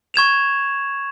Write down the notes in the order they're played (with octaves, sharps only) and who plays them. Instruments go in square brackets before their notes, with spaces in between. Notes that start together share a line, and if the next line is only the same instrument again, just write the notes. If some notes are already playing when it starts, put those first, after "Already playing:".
[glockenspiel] C#6 G#6 E7 F7